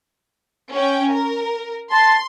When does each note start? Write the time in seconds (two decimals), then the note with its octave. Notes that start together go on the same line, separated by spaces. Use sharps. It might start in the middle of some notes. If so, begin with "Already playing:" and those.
0.72 C#4 G5
1.09 A#4
1.92 A5 C6